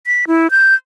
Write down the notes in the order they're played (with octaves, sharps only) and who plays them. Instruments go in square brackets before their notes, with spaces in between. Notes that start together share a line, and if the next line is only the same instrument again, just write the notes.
[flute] B6
E4
G6